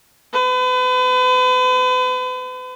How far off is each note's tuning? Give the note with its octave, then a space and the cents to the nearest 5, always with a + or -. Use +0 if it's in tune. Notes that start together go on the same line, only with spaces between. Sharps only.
B4 +40